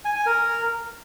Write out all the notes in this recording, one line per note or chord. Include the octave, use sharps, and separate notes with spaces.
G#5
G#5
A#4